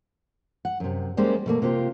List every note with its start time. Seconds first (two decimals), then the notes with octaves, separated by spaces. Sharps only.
0.65 F#5
0.80 F#2 C3
1.17 G3 G#3 A#3 C#4 G4 C5
1.46 B2 A3 A#3
1.62 C3 A#3 F4 G4